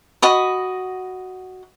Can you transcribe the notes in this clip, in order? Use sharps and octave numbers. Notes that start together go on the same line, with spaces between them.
F#4 D#5 B5